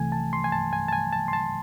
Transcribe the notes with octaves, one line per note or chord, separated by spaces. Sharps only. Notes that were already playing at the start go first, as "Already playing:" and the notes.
Already playing: C2 C3 E3 A3 G#5
A5
C6
G#5
A5
G#5
A5
G#5
A5
C6
A5